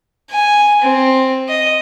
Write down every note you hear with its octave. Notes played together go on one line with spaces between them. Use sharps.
G#5
C4
D#5